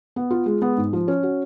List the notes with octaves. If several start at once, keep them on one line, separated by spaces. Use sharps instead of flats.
B3
F4
G#3
B3
G#2
F3
C#4
F#4